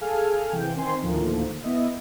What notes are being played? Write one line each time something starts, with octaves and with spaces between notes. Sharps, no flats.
G#4 A4 F5 G#5 F6
C3 E3 G5
D#3 C4 G#5 C6
D2 A2 D3 D#3 F3 A#3
B3 E4 D#5 E5